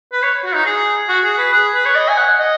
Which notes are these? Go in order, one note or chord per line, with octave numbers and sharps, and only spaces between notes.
B4
C#5
F#4
D#4
G#4
F#4
G#4
B4
G#4
B4
C#5
D#5
G#5
F#5
D#5